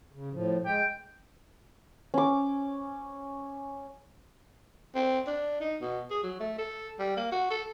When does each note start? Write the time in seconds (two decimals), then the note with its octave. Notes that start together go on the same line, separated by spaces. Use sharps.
0.12 C#3
0.33 A2 F3
0.66 G#3 G5
2.14 C#4 D6
4.95 C4
5.27 D4
5.61 D#4
5.81 B2
6.11 G#4
6.23 F#3
6.40 A3
6.58 A4
6.99 G3
7.17 A#3
7.32 F#4
7.51 A4